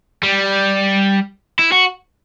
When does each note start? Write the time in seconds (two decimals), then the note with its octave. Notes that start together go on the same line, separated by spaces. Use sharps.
0.23 G3
1.59 E4
1.72 F#4